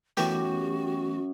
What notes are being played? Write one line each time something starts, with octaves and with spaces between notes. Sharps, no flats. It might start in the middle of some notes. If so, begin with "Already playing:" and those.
F#2 E3 A3 B3 F#4 G4 C#5